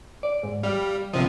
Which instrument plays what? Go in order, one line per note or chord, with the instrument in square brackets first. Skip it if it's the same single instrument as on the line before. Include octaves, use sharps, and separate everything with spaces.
[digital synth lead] D5
G#2
[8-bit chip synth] G3 [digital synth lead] F5
[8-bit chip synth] G1 C3 F3 [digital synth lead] D#5